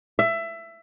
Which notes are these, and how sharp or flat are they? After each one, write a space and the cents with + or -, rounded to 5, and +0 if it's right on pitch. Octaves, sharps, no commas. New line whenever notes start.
E5 +20